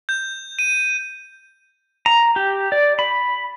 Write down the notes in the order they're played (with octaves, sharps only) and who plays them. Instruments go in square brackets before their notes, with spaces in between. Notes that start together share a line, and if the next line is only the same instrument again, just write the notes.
[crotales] G6
D#7
[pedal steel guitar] A#5
G4
D5
B5